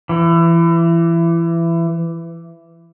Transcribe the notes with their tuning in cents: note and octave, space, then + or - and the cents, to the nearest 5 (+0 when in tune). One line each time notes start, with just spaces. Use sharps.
E3 +25